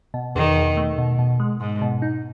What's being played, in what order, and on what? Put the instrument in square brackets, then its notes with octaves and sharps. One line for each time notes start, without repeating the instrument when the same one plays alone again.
[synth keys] B2
[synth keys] E2 [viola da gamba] D#3
[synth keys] B2
A3
B2
B2
G#3
[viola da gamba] G#2 [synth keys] G#3
[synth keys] B2
D#4